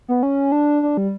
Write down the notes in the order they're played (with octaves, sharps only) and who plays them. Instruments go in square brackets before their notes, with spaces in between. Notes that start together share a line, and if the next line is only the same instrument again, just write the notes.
[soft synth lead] B3
C#4
D4
D4
G3